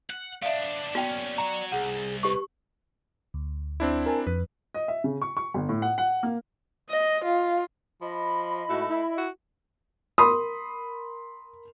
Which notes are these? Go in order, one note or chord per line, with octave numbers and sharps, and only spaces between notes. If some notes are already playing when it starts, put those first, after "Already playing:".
F#5
B3 D4 D5 E5 F5
A#3 B3 C#4 F#4 G5
F#4 C#5 A#5
C2 G#4 F#5
G4 B4 C#6
D2
C4 D4 E4
A#4 G#5 A5
F2 B4
D#5
E5
C#3
C#6
C#6
G1
A2
F#5
F#5
A#3
D#5
F4
F3 D#5 B5
G#2 A3 E4 F#4
E4
F#4
A#4 B5 C6 D#6